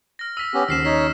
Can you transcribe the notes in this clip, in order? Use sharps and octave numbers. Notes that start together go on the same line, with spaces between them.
F6 A#6
E6 B6 D#7 F7
B3 C#4 G4
D#2 C#3 F3 F6 C7 E7
D#4 C#5 B6